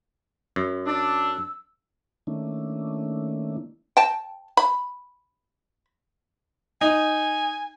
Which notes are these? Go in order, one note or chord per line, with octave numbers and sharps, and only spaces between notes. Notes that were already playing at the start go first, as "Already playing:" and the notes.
F#2
D4 E6
D#3 A3 A#3 C#4 D4 E4
G5 A5
B5
D#4 G#5